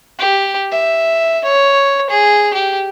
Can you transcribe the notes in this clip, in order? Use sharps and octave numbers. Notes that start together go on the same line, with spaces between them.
G4
E5
C#5
G#4
G4